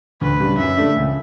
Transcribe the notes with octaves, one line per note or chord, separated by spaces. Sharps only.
D2 B4
C#3 G3 D4
F#2 E5
D3 A3 D4
C#2